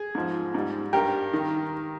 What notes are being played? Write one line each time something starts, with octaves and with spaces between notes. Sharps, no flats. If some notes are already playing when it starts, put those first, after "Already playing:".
Already playing: G#4
G#2 F3
G#2 G3
G2 G3 G4 A#4
D#3